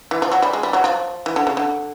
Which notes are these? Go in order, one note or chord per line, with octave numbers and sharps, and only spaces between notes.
E3
F3
F#3
G3
G#3
G3
F#3
F3
E3
D3
C#3
D3